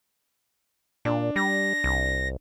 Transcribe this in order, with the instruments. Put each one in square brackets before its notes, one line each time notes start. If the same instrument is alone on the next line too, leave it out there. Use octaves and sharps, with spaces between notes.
[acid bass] A#2 [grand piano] D4
[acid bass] G3 [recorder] A#6
[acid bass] C2